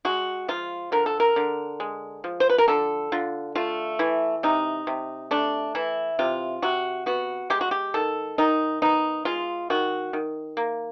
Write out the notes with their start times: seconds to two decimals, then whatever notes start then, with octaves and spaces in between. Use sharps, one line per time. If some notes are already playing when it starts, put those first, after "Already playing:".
0.05 G#3 F#4
0.48 F3 F4
0.92 D3 A#4
1.06 A4
1.20 A#4
1.36 D3
1.80 G#3
2.24 F3
2.40 C5
2.50 B4
2.58 A#4
2.68 D3 A4
3.12 D3 F4
3.55 A3 F4
3.99 E3 E4
4.43 C3 D#4
4.87 C3
5.31 A3 D4
5.75 E3 E4
6.19 C3 F4
6.62 C3 F#4
7.06 B3 F#4
7.50 G#3 G4
7.61 F#4
7.71 G4
7.94 D#3 A4
8.38 D#3 D#4
8.82 B3 D#4
9.25 G#3 F4
9.70 D#3 F#4
10.13 D#3
10.57 A#3